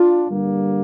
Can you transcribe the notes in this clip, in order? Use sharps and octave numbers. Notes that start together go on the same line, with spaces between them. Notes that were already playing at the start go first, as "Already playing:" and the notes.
Already playing: D4 F4
G2 D3 G3 A#3